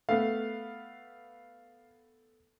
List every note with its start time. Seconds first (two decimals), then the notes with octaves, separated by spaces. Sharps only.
0.09 A3 B3 F5